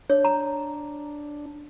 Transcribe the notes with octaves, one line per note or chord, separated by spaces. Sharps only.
D4 C#5
A#5